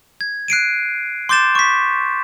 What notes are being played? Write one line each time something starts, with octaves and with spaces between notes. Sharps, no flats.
G#6
F#6 C7 D7 D#7
C6 D6 G6 A6 E7
C#6 B6